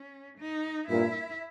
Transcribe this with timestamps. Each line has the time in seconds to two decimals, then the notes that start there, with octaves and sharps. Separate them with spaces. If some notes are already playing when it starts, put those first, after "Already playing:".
Already playing: C#4
0.38 D#4
0.89 G2 A#2 E4